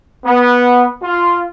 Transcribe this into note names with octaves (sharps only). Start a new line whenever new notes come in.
B3
F4